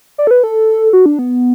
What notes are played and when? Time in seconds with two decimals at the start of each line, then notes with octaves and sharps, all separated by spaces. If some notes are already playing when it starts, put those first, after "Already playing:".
0.18 D5
0.27 A4
0.31 B4
0.44 A4
0.93 F#4
1.06 D4
1.19 B3